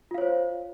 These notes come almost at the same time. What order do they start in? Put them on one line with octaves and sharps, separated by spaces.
F4 F5 C#5 C5